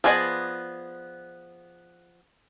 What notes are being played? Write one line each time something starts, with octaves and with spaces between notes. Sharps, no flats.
F3 B3 G#4 D5 D#5